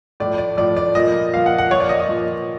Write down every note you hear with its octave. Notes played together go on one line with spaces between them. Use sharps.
A2 F3 D5
D5
A2 F3 D5
D5
A#2 F3 D#5
A#2 F3 F5
F#5
F#5
A#2 F3 C#5
D5
D#5
D#5
A#2 F3